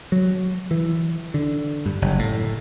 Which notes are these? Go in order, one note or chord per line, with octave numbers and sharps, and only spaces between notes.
F#3
E3
D3
G2
F#1
A2